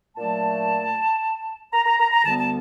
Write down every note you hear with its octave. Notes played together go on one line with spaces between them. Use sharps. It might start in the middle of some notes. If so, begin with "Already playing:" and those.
A#2 F#3 A3 D4 A5
A#5
A#5
A#5
A#5
D2 D3 G3 B3 A5
A5